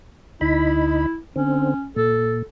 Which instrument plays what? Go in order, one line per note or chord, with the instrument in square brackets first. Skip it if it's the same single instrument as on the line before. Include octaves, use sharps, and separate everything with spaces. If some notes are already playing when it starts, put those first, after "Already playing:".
[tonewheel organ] D2 D#4 B5 [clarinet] E4
[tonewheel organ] D3 C4 [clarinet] C#4
[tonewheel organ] A#2 [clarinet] A4